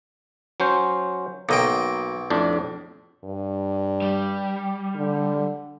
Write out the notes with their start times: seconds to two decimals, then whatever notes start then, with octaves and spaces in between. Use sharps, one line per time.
0.60 F#3 C#4 C5
1.49 B1 F#3 A#3 D#5 G5
2.30 F2 A2 D4
3.24 G2
4.02 G3
4.96 D3